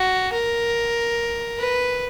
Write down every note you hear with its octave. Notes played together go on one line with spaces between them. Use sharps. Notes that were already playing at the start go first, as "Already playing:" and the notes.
Already playing: F#4
A#4
B4